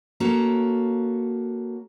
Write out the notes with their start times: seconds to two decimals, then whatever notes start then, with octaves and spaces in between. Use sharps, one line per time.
0.20 A#3 C#4 F#4 A4